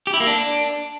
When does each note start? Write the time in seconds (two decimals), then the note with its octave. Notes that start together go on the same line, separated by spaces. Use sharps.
0.07 G4
0.14 E4
0.20 A#3
0.27 D4